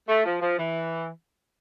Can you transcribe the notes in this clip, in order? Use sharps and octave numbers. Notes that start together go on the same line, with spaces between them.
A3
F3
F3
E3